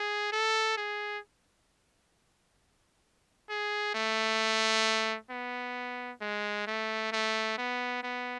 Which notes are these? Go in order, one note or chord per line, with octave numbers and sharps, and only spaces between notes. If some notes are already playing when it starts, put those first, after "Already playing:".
Already playing: G#4
A4
G#4
G#4
A3
B3
G#3
A3
A3
B3
B3